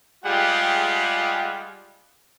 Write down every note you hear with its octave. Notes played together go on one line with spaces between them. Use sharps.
G3 G#3 F4 G4 G#4 F#5